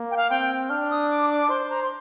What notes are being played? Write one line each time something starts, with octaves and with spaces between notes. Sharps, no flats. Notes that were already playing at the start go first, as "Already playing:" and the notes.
Already playing: A#3
G5
F5
C4 G5
D4 F6
D#6
D6
D6
C5 C6
A#5
C6